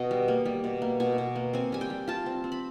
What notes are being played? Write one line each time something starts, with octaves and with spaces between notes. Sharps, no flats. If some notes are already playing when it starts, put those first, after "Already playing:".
Already playing: B2 D#5
G3
A#3
G3
B2
A#3
B2 G#5
B2
A#3
C4 G#5
G3 G#5
G5
G3
F4 A5
C4
C4
B5